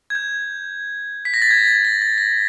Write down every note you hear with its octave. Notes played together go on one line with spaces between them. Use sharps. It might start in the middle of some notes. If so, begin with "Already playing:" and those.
G#6
G6
B6
A#6
A6
G#6
A6
A#6
A6
A#6